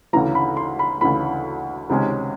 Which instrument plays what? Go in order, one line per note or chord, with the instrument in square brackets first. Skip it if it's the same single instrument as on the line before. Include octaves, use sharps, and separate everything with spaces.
[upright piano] D2 C#3 E3 A#5
B5
C6
B5
D2 C#3 E3 B5
C#2 C3 D#3 G#3 C#4